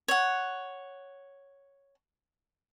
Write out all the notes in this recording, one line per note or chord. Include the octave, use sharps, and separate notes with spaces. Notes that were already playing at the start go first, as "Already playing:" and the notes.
C#5 F#5